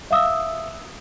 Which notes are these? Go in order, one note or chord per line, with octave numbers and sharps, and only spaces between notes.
E5 F5 D#6 E6